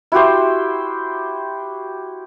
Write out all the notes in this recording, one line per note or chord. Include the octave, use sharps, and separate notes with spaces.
E4 F#4 G4 C5